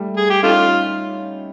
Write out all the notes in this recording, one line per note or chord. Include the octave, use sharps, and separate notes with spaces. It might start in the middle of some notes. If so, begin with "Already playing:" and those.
Already playing: G3 A3
G#4
G4
A3 C#4 D#4 F4